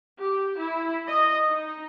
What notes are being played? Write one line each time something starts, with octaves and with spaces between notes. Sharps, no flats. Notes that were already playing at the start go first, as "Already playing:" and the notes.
G4
E4
D#5
D#4